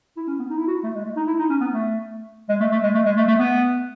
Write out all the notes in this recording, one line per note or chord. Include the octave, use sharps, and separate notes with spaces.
E4
C#4
B3
D#4
E4
F#4
A3
G#3
A3
D#4
E4
D#4
C#4
B3
A3
G#3
A3
A3
G#3
A3
G#3
A3
A3
B3